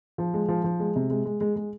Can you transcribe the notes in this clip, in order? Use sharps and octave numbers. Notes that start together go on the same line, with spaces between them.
F3
G#3
F3
F3
G#3
C3
G#3
G#3
G#3
G#3